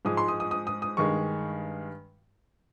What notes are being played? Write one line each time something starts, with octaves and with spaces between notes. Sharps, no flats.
G#2 F3 G#3 D#6
C6
D#6
D#6
D#6
D#6
D#6
G2 D#3 G#3 C#6